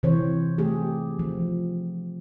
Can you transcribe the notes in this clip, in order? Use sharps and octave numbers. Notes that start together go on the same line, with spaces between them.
C3 E3 C4 C5 C#5
A3 G4 G#4
F3